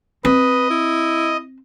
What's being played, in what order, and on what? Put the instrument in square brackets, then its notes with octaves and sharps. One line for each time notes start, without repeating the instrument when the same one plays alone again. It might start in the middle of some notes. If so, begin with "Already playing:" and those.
[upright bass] C4 [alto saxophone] B4 [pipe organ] D#5
[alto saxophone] E4